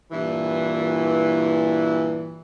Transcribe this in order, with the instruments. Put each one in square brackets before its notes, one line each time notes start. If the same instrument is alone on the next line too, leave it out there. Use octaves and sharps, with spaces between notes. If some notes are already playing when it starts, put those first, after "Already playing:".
[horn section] G2 A#2 E3